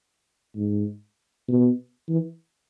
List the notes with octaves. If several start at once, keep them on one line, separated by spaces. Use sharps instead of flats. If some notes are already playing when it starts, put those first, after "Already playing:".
G#2
B2
E3